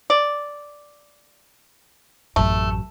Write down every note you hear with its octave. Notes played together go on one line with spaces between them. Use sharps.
D5
A1 F#2 A3